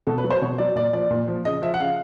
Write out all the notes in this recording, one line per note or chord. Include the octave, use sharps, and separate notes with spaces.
B2 A4
B4
F#3
C5
B2 C#5
F#3 D5
A#2 D5
F3 D5
A#2
F3
C#3 D#5
F3 E5
F#5
C#3 F5